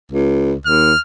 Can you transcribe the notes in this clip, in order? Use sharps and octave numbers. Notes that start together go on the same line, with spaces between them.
C#2
D#2 F6